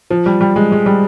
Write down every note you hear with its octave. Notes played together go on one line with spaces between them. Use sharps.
F3
G3
G3
G#3
G#3
G3